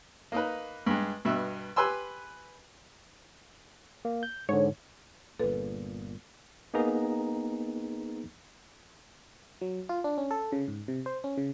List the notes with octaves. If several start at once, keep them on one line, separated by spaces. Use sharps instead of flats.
A#3 D#4 B4
G2 G#3
G2 B2 E5
G4 B4 G#5 C6 E6
A#3
G6
G#2 D3 C#5
G1 A#2 A4 B4
A#3 B3 D#4 G#4 A#5
F#3
F4
D4
C#4
A4
C#3
G#2
C3
C5
C#4
C#3